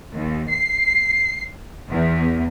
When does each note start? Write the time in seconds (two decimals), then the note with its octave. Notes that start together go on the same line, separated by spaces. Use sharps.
0.13 D#2
0.50 C7
1.90 E2